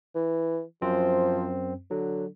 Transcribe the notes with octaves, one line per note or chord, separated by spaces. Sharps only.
E3
F#2 F3 C4
D3 F#3